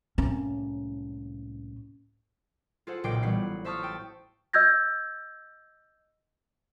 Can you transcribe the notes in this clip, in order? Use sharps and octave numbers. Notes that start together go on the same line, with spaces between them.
C2 A2 A#3 C#4
F4 G#4 A4 C5 F#5
F#1 B1 A#2 G5 D6 C7
A1 G3 B3 F#5 C7
C5 E5 A5 C#6 D#6 F6
G5 A5
D#5 E6 G6 G#6 A#6